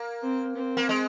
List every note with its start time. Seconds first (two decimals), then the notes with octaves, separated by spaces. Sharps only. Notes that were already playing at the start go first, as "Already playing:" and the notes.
Already playing: A#3
0.23 C4
0.56 C4
0.77 A#3
0.89 G#3